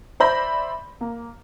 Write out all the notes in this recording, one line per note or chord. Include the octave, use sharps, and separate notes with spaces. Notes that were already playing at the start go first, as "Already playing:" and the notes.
C5 D5 E5 B5 G6 A#6
A#3